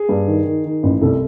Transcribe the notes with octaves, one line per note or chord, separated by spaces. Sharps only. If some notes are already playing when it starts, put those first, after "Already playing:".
Already playing: G#4
G2
D#3
D#3
D#3
A1
C2 A4